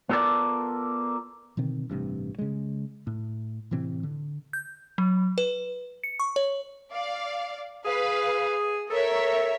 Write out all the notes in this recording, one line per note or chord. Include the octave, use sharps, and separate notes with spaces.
B3 F4 A4 A#4 D5
B2 D3 D#3 C4
A1 G2 C3
C#3 G#3
A2
A2 C3 E3 C4
D3
G6
F#3
B4
C#7
C#6
C#5
D5 F5
G#4 B4 F5
A4 A#4 C#5 E5